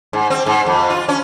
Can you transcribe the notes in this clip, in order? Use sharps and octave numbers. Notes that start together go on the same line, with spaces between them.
G#2
C4
G#2
F2
F4
C#4